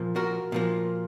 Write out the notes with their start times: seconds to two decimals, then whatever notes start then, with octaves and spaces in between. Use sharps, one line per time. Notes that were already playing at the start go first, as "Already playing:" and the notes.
Already playing: A#2 F3 A#3
0.16 F#4 A#4
0.52 A#2 F3 A#3